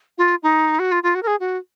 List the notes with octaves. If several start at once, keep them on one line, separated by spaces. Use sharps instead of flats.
F4
D#4
F#4
F4
F4
F#4
A#4
G#4
F#4